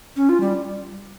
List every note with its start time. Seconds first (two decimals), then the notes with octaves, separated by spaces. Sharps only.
0.16 C#4
0.29 F4
0.40 G3